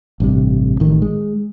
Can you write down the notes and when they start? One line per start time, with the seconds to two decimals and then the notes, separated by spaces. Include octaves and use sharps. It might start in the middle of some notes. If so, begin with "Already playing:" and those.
0.20 A1 G2 C3
0.80 A1 D#3
1.02 G#3